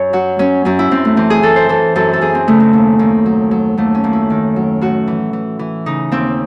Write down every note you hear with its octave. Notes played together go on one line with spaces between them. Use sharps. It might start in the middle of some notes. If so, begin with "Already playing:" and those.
Already playing: F#2 C#5
F#3 F#4
F#3 C#4
F#2 C#4
E4
F#2 C4
A3
E3 C4
G#4
E3 A4
C5
E3 A4
F#2 A4
A4
F#2 G#4
C4
C#3 A3
C4
D#2
D#2
F#3
F#3
D#2 A3
C#4
D#2
E4
D#3
F#3
A2 F#4
E3
E3
E3
C#3 D#4
D#2 C4